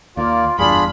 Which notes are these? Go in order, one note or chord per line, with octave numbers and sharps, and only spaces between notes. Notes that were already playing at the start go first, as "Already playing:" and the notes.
D#2 A#3 F4 D5
F#1 E2 G2 D4 F4 G#4 B5